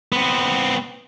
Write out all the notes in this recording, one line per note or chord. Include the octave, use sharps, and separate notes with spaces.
B3 C4